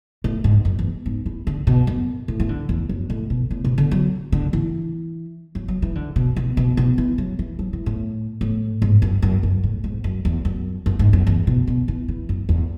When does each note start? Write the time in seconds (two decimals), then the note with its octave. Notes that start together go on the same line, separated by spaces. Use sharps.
0.24 A2
0.44 G#2
0.65 F#2
0.79 E2
1.06 G#2
1.26 E3
1.47 D3
1.67 B2
1.87 F#2
2.28 A2
2.40 E3
2.49 D3
2.69 E2
2.89 F#2
3.10 A2
3.30 B2
3.51 A2
3.64 B2
3.78 D3
3.91 F#3
4.32 D3
4.53 E3
5.55 F#3
5.68 F#3
5.82 E3
5.95 D3
6.16 B2
6.36 B2
6.57 B2
6.77 B2
6.98 E3
7.18 F#3
7.39 E3
7.59 F#3
7.73 E3
7.86 A2
8.41 A2
8.82 G#2
9.02 F#2
9.22 F#2
9.43 F#2
9.64 A2
9.84 G#2
10.04 F#2
10.25 E2
10.45 F#2
10.86 F#2
10.99 G#2
11.13 F#2
11.27 E2
11.47 B2
11.67 B2
11.88 E3
12.08 E3
12.29 F#2
12.49 E2